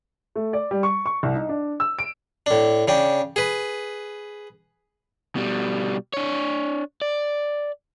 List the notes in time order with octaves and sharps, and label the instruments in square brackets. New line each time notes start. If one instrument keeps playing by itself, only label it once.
[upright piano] A3
D5
G3
C#6
C#6
C2
D#4
D4
E6
D7
[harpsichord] A2 D4
C#3 D4 G5
G#4 B4
[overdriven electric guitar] B2 G3
D4 C#5
D5